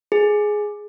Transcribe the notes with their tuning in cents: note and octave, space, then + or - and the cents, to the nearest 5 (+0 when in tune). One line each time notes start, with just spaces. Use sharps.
G#4 +10